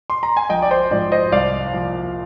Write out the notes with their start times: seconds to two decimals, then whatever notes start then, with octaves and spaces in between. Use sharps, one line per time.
0.10 C6
0.23 A#5
0.37 G#5
0.49 A#1 D#5 G5
0.62 D5
0.71 C5
0.91 G#2 F3 D5
1.12 C5 D#5
1.32 C2 D5 F5
1.73 A#2 F3